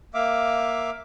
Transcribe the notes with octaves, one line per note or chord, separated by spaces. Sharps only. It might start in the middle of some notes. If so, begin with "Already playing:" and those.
A#3 E5 F5 D6